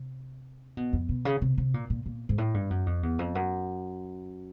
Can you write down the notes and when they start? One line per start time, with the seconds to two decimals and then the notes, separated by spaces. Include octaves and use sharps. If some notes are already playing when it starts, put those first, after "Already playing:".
Already playing: C3
0.77 B2
0.93 F2
1.09 B2
1.25 C#3
1.41 C3
1.58 C3
1.74 A#2
1.90 A#2
2.06 A#2
2.29 G#2
2.38 A2
2.54 G2
2.70 F#2
2.86 F2
3.03 E2
3.19 F2
3.35 F#2